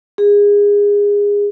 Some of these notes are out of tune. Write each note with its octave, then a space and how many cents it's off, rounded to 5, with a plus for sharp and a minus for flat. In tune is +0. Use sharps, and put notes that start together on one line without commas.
G#4 -25